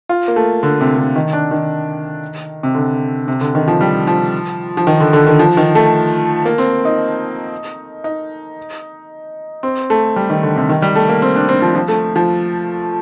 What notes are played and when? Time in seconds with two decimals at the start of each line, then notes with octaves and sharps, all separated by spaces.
0.09 F4
0.28 A#3
0.36 A3
0.63 D3
0.81 C3
0.98 D3
1.16 D#3
1.33 D4
1.51 D#3
2.63 C3
2.75 D3
3.28 C3
3.41 D3
3.55 D#3
3.68 F3
3.81 G3
4.07 F3
4.77 F3
4.87 D#3
5.00 D3
5.13 D3
5.27 D#3
5.39 F3
5.57 D#3
5.75 A3
6.45 A#3
6.58 C4
6.85 D#4
8.04 D#4
9.63 C4
9.90 A3
10.16 G3
10.30 D#3
10.43 D3
10.56 C3
10.69 D#3
10.82 G3
10.96 A3
11.09 A#3
11.22 C4
11.36 D4
11.49 C4
11.62 F3
11.75 F3
11.88 A3
12.16 F3